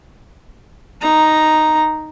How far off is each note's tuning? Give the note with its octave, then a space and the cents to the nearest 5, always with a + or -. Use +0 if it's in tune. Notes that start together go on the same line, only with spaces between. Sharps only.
D#4 +0 A#5 +5